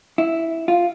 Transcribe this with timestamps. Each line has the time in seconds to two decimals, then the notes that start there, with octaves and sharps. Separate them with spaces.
0.18 E4
0.68 F4